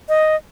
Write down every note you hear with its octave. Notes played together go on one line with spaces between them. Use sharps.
D#5